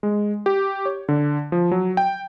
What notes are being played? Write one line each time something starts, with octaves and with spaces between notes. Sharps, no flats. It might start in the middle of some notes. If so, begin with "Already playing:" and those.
G#3
G4
C#5
D3
F3
F#3
G5